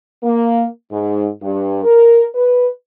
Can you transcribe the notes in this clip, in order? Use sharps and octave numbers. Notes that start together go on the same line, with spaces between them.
A#3
G#2
G2
A#4
B4